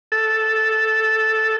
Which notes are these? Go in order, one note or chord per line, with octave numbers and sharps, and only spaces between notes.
A4